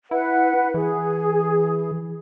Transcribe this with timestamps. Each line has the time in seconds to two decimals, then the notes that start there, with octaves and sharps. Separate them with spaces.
0.11 E4 B4 F#5
0.74 E3 G#4